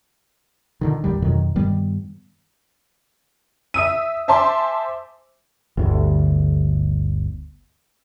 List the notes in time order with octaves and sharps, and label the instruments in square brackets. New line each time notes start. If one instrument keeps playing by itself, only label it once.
[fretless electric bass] A#2 D3 D#3
A1 D#2 D#3 G3
F2 B2 D#3 F#3
G2 D#3 G3 B3
[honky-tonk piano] E5 D#6 E6 D#7
C5 E5 G#5 A5 C6 D6
[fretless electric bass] G1 D2